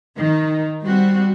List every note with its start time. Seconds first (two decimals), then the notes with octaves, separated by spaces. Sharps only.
0.16 D#3
0.83 G3 C4 F#4